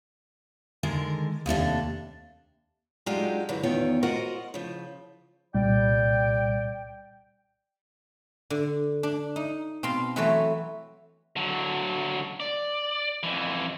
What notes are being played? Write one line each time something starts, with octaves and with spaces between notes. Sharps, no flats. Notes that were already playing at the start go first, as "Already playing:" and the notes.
D3 D#3 G#3 A#4
D#2 C3 A3 D4
F#3 G#3 D4 D#4 F4 G4
F#2 D3 E3
E2 D#3 B3 F4 C#5 G5
F4 F#4 A#4 C5 D#5 F#5
C#3 F3
C2 A#2 G3 D5 G5
D3
D4
D#4
B2 C4 F5 C6
E3 F#3 A3 C4 B4 C#5
D3 F#3
D5
F2 E3